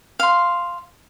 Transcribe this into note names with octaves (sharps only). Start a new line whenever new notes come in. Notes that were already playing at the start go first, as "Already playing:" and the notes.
F5 C6